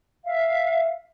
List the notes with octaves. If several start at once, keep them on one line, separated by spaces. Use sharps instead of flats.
E5 F5